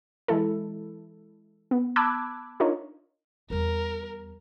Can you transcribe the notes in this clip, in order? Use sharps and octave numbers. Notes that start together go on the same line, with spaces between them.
E3 G#3 E4 A4
B3
A5 B5 D6 E6 F#6 G#6
D4 D#4 F4 A#4 C#5 D#5
E2 G3 A#4